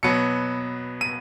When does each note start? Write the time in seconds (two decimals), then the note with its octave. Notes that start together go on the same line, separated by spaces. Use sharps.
0.03 B2 F#3 B3 C#7
1.01 D#7